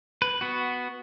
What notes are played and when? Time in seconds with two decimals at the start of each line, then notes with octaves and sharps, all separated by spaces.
0.22 B4
0.41 B3 F#4